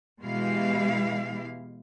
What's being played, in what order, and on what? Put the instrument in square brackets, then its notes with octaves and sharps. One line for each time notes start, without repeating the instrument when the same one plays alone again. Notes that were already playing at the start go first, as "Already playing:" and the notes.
[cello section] B2 E3 G#3 E4 G4 F5